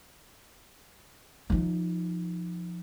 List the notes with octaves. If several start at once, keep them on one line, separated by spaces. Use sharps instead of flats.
F3 D#4